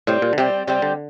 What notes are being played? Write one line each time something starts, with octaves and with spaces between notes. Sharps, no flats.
A2 G3 C4 G4
A#2
D3
C3 G3 C4 G4
C3 G3 C4 G4
D3